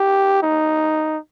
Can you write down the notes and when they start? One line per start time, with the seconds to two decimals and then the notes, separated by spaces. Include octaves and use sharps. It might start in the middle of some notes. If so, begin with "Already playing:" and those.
Already playing: G4
0.43 D#4